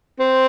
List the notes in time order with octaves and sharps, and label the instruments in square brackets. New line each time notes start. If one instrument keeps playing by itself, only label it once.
[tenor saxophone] C4